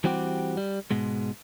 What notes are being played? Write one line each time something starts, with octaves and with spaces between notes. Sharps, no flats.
E3 G3 C4 F#4 G4
G3
G#2 B2 G#3